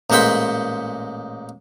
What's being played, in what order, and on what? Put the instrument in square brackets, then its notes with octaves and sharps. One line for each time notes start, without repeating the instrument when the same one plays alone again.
[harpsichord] A1 A#2 G#3 C5 F#5 B5